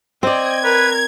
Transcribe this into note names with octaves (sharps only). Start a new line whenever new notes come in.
C4 D5 D#5 G5 G#6
A#4 B4